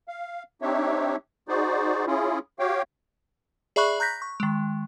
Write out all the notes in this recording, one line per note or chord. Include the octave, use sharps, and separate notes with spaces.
F5
C4 D4 D#4 G4 C#5 E5
D#4 F#4 G#4 C5 D5
C#4 E4 F4 G#4
F#4 G4 C#5 F5 G5
G#4 D5 E5 B5 C#6 F#6
A#5 F#6 G6 A#6 B6
C#6
D#3 G#3